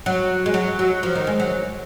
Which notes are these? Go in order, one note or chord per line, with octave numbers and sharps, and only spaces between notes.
F#3
G#3
F#3
F#3
F3
D#3
G#3
F#3